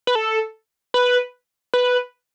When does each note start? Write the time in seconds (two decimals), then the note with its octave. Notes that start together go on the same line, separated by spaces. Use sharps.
0.07 B4
0.15 A4
0.94 B4
1.74 B4